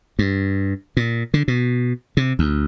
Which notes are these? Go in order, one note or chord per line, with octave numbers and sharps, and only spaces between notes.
G2
A#2
D3
B2
C3
D2